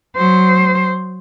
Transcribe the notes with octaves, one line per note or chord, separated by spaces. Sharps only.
F#3 C5